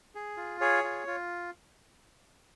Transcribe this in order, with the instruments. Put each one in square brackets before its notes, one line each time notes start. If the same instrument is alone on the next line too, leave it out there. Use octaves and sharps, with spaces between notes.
[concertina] G#4
F4
G#4 C#5
F4
F4